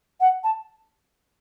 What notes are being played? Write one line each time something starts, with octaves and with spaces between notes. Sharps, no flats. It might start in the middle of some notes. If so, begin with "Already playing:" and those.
F#5
A5